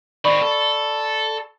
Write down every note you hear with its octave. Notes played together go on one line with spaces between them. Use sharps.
D#3 C4 D5 B5 C#6
A4